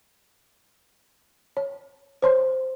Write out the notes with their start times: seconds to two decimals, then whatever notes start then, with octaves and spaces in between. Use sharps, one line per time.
1.57 C#5
2.22 C5 C#5 C6